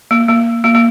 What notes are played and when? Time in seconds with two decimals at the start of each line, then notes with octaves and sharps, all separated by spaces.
0.11 A#3
0.28 A#3
0.64 A#3
0.75 A#3